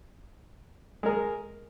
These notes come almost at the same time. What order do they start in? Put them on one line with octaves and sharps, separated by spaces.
G#3 A#4 G#4